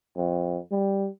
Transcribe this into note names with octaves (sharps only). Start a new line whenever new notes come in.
F2
G3